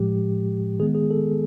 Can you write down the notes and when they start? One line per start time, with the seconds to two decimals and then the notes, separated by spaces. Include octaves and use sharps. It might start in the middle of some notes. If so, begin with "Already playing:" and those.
Already playing: A2 F3 G#3 G4
0.79 D#3 G#3 B3 G#4
0.95 G#4
1.11 A4